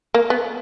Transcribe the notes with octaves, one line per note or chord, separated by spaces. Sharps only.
A#3
B3